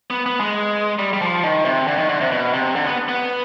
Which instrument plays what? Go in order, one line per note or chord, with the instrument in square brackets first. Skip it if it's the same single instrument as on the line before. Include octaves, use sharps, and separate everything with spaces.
[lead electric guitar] B3
B3
G#3
G3
G3
F3
D#3
C3
D3
D#3
D3
C3
B2
C3
D3
B3
B3